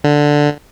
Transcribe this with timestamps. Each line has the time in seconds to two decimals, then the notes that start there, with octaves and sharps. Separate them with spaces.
0.04 D3